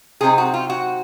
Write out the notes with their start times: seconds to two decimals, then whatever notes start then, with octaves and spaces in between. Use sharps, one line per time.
0.21 C3 F#3 C4 D#4 G#4
0.38 F#4
0.54 F4
0.70 F#4